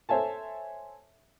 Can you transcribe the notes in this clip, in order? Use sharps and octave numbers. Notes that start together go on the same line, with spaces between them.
A4 C5 C#5 E5 G#5 A5